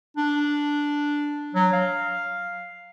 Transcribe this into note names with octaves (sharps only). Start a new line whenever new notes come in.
D4
F#3
F5